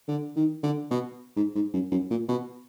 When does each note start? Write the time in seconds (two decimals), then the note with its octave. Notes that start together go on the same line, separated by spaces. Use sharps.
0.08 D3
0.36 D#3
0.63 D3
0.91 B2
1.37 G#2
1.55 G#2
1.74 F#2
1.92 F#2
2.11 A#2
2.29 B2